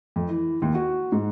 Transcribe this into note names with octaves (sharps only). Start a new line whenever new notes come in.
F2
E3
D#2
F#4
G#2